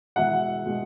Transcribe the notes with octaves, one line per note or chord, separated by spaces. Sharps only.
E2 B2 G#3 E5 F#5
B2 G#3